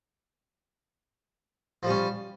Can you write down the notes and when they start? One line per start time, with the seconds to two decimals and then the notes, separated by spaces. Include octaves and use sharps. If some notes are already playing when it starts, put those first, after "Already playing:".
1.83 F3
1.86 G3
1.90 C#4